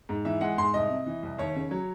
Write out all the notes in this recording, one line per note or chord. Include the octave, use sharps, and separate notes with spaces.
G#2
E3 E5
G#3 F#5
G#2 C6
C2 D#5
C3
E3
C2
D#2 C#5
C#3
F#3